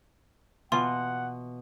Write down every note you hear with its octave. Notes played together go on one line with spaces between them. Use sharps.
B2 E3 F4 F#5 C6